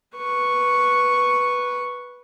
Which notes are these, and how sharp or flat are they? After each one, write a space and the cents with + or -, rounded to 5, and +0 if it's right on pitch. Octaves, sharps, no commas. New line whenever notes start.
B4 -5 C#6 +0